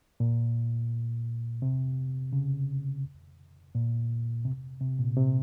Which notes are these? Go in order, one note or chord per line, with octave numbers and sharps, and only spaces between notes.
A#2
C3
C#3
A#2
C3
C3
A#2
C3